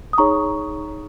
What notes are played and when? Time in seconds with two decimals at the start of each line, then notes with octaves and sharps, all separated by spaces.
0.13 D#6
0.18 D#4 G#4 C#5 A#5 C#6